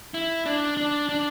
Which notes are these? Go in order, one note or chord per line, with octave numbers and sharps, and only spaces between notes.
E4
D4
D4
D4